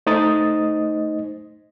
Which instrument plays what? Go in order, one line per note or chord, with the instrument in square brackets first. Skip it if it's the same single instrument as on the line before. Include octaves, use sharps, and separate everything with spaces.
[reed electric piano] A3 D#4 C5 D#5 D#6 A6